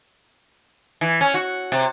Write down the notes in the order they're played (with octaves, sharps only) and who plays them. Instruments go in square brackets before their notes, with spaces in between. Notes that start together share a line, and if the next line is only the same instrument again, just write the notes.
[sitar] E3
C#4
F#4
C3